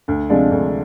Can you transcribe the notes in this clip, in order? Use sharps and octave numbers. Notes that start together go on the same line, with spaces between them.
D2
C3 F3 G#3 D4
D2